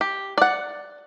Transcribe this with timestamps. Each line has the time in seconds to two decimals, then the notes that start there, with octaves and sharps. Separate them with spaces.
0.01 G4
0.38 D5 F#5